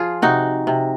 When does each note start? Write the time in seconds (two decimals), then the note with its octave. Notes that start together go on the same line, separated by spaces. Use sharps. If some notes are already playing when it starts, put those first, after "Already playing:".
Already playing: F3 F4 G#4
0.22 C3 D#4 F#4
0.67 C3